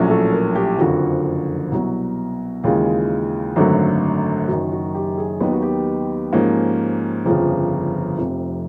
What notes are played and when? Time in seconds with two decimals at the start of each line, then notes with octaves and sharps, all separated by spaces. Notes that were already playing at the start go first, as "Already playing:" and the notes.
Already playing: A#1 A2 F#3 A3 C#4
0.10 A4
0.32 A#4
0.55 G4
0.78 F#1 F2 D3 F3 F#4
1.71 C2 B2 F#3
2.64 D#2 C#3 E3 G#3 F4
3.56 G#1 F#2 D3 F#3 A3
4.48 F#1 F#2 D#3 F#4
4.72 F#4
4.95 G4
5.18 G#4
5.40 D#2 D#3 F#3 B3 D#4 G4
5.52 F#4
5.62 G4
6.33 G#2 F3 A#3 C#4
7.25 G1 F2 C#3 F3
8.18 F1 F2 C3